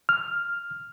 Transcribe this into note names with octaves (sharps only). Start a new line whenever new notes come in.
F6